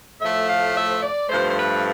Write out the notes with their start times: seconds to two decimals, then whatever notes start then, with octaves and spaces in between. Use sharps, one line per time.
0.20 A2 F3 A3 E5
0.48 F5
0.75 E5
0.90 C5
1.02 D5
1.29 G2 F3 A3 C5
1.50 C5
1.57 B4